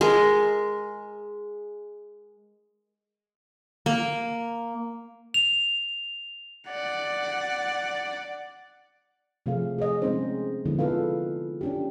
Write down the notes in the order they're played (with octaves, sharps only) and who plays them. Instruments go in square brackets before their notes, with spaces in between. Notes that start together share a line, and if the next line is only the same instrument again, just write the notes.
[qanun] G#3 A#4
A#3
[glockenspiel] F7
[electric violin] D5 F#5
[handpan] C3 F3 A3 G#4 F5
G#4 C#5 D#5
F3 G#3 C4 C#4 D#4 C5
D3 F3 G#3 B3 E4
D#4 F4 A4 B4 F5
C#4 D4 G4